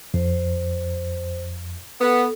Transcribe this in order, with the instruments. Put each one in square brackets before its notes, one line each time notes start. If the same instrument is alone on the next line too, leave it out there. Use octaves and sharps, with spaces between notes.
[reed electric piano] F2 [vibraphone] C5
[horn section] B3 [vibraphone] A4